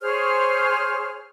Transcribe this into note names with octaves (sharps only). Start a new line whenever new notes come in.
G#4 C5 C#5 F6